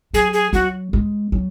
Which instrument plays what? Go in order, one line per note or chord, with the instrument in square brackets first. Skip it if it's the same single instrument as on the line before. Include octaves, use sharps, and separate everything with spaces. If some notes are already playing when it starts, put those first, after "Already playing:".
[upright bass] F#3 [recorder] G#4
[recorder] G#4
[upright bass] F#3 [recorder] F#4
[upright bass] G#3
F#3